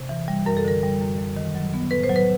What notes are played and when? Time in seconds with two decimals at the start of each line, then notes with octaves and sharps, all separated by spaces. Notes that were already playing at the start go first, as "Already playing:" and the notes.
Already playing: C3
0.09 E3
0.28 G3
0.46 F#2 A#4
0.57 A4
0.64 D3 A#4
0.83 G3
1.01 F#2
1.18 F#2
1.37 D#3
1.55 F#3
1.74 B3
1.91 A2 B4
2.04 C5
2.10 F#3
2.16 B4